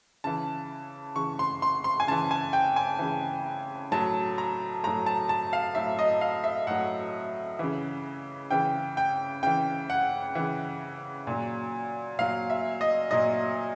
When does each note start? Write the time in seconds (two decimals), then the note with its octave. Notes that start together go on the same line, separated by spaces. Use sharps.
0.24 C#3 E3 A5
1.16 C#3 E3 C#6
1.39 C6
1.62 C6
1.84 C6
2.00 G#5
2.07 C#3 E3 A5
2.31 G#5
2.53 G5
2.76 G#5
2.99 C#3 E3
3.92 A2 F#3 A5
4.38 A#5
4.83 A2 F#3 A#5
5.06 A5
5.29 A5
5.53 F5
5.75 A2 F#3 E5
5.99 D#5
6.21 F5
6.44 E5
6.67 A2 F#3 F#5
7.59 C#3 E3
8.51 C#3 E3 G5
8.97 G5
9.43 C#3 E3 G5
9.90 F#5
10.35 C#3 E3
11.27 A#2 F#3
12.19 A#2 F#3 F5
12.50 E5
12.81 D#5
13.11 A#2 F#3 D#5